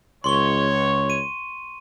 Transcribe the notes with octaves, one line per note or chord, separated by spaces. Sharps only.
C#2 C#5 C6 C#6 G7
D#7